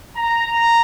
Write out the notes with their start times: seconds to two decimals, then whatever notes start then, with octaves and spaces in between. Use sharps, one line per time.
0.17 A#5